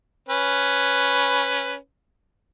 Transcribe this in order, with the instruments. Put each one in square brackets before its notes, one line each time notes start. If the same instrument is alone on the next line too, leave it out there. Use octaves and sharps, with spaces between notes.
[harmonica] C#4 B4